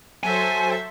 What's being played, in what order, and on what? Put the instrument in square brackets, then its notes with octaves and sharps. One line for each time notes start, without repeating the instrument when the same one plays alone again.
[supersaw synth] F#3 A4 C5 [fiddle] E5 [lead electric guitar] G#5